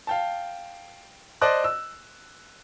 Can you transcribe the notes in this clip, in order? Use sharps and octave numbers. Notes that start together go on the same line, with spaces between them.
F5 G5 A5
C5 D5 D#5 A5 D6 F#6
E6